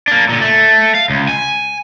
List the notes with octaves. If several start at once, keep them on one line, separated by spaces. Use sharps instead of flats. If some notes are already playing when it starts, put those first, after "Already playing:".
A#3 D4
A#2 D3
A3
F5
C#2
G#5